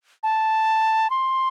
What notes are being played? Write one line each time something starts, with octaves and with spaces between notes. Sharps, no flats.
A5
C6